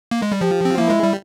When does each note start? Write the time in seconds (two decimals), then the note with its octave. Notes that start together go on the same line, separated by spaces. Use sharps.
0.11 A#3
0.22 G#3
0.32 G3
0.41 F3 G4
0.65 C4
0.78 A#3 E4
0.90 G#3
1.03 G3